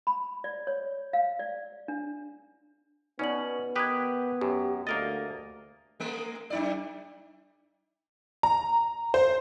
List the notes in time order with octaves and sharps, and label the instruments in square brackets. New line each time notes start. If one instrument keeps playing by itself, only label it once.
[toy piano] B5
D5
C#5
F5
D5
D4
[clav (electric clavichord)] B2 C#4 [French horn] B3 [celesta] D#4 D5 F#7
[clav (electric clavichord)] D#3 G4 B4 [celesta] D#6 F#6 G#6
[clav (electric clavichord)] F#2 [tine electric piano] G4
[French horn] D2 [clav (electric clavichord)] A#3 A#4 D#5 [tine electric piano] A6
[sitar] G#3 A3
F#2 D#4 D5
[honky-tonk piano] A#5
C5